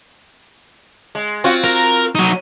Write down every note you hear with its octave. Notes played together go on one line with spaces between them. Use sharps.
G#3
C4 F4 F#4
A#4
F#3 D#4